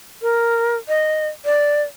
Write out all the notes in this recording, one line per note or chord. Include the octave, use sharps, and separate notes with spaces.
A#4
D#5
D5